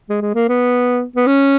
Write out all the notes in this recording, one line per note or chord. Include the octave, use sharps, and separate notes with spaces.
G#3
G#3
A#3
B3
B3
C#4